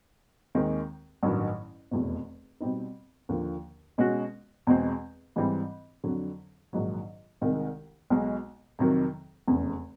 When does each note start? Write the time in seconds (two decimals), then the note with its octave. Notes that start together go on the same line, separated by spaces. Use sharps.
0.55 D#2 D#3 G#3 C4
1.23 A1 G2 D#3 F#3
1.91 F1 E2 B2
2.60 B2 G3 C4 D#4
3.29 D#2 D3 F3 A#3
3.98 B2 G#3 C#4 F#4
4.67 E2 B2 G#3 C4
5.36 G#2 E3 G3 C4
6.04 F2 D3 F#3
6.73 A#1 G#2 D#3 F#3
7.41 C2 C3 D#3 G#3
8.10 B1 B2 G#3
8.79 F2 C3 D#3 F#3
9.48 F1 E2 C#3